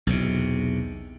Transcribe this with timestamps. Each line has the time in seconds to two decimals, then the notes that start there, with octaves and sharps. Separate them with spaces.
0.07 B1 E2 C3